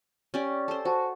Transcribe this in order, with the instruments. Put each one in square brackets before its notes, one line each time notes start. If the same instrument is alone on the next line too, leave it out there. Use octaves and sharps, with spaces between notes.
[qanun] C#4 G4 D5
A4 C5
[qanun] F#4 [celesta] C5 A5